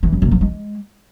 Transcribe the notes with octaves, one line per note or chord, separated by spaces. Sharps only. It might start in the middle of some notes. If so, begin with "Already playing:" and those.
E3
F#2
A#2
F3
G#3